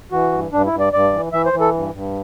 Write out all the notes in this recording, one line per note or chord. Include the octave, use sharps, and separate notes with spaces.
E3 F#4
G2
G2 D4
E4
G2
D5
G2 D5
E3
E3 E5
C5
E3
A4
G2
G2